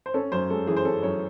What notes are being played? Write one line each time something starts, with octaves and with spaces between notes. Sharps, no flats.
C5
C#4 A4
F#2 C5
G#3 A4
E3 G#4
C5
C#4 A4
F#2 C#5